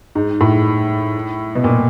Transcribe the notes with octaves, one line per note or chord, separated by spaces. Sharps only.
G#2
A2
B2
A#2